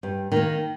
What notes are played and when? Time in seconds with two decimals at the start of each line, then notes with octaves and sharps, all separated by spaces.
0.03 G2
0.32 D#3 A#3